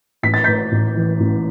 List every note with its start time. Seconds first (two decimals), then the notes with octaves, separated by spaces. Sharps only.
0.23 A1 B6
0.34 A6
0.44 A2 G6 B6
0.72 A1
0.96 E3
1.20 A1